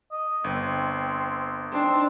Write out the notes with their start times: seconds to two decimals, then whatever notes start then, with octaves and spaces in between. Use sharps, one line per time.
0.11 D#5
0.44 G1 C4
1.72 C4 D4 D#4